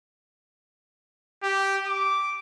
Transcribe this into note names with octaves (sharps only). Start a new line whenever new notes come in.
G4
D6